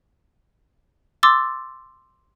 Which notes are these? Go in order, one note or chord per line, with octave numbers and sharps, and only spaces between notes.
C6 D6 E6 A6